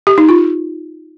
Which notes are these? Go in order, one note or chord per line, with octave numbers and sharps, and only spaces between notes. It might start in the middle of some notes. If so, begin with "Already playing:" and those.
G4
D#4
F4